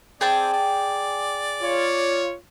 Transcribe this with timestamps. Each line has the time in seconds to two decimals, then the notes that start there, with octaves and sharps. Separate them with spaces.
0.21 C4 G#4 D5 G5 A5
0.53 D5
1.62 F4 C#5